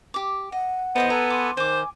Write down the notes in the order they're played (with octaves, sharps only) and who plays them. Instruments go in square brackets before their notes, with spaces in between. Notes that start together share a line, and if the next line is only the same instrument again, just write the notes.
[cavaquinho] G4 D6
[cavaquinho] D#5 [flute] F#5
[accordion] E2 C5 D#5 [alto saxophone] B3 [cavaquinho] A4 E5 D#6
[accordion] A4 B4 G#5 [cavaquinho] A#5
[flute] C6 [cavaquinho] D6
[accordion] D#3 [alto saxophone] C5 [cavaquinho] G#5 D6